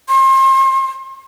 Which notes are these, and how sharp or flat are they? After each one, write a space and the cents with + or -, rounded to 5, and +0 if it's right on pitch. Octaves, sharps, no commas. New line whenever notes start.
C6 +35